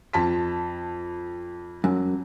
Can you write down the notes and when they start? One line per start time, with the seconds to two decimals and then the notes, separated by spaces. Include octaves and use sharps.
0.13 F2 A5 B6
1.84 F#2